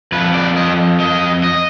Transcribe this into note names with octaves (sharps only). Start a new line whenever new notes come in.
F2 F3 B4
D5
D#5
D#5
D#5